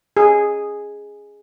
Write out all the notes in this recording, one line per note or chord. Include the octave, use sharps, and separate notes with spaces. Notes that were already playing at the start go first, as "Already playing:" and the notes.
G#4